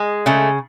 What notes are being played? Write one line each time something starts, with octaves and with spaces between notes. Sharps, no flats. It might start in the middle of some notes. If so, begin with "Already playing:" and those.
Already playing: G#3
C#3 A3